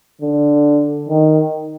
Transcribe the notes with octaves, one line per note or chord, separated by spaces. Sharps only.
D3
D#3